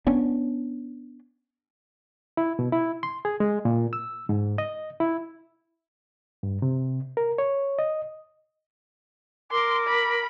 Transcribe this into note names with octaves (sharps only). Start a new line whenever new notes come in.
B3 C#4 D4
E4
B2
E4
C6
G#4
G#3
A#2
E6
G#2
D#5
E4
G2
C3
A#4
C#5
D#5
A#4 C6 D6
B5